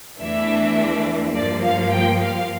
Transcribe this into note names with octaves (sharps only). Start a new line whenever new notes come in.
E2 E3 A3 D4 E5
G2 F3 A#3 D5
F5
G5
F5